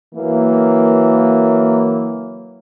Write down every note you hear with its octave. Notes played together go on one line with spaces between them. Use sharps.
E3 F#3 A#3